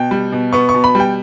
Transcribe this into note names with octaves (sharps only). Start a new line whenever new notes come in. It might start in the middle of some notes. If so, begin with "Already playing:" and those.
Already playing: B2 G5
G3
B2
B3 C#6
C#6
B2
B5
G3 G5